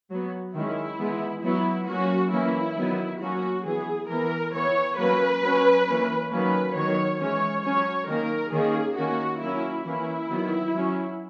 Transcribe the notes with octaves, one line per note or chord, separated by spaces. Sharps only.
F#3 B3
D#3 G#3 C#4 E4
E3 G#3 B3
F#3 B3 E4
F#3 A#3 C#4 F#4
E3 A#3 C#4 E4
D#3 F#3 B3
F#3 A#3 C#4 F#4
E3 B3 G#4
E3 B3 A#4
E3 B3 C#5
F#3 A#3 C#4 B4
F#3 C#4
E3 A#3 C#4
D#3 F#3 A#3 C#4 B4
D#3 F#3 B3 C#5
E3 G#3 C#4 C#5
F#3 C#4 C#5
D#3 A#3 C#4 A#4
D#3 A#3 C#4 G#4
D#3 A#3 C#4 F#4
F#3 A#3 C#4 E4
E3 A#3 C#4 E4
D#3 F#3 B3
F#3 C#4